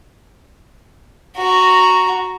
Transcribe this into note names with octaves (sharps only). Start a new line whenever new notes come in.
F#4 A#5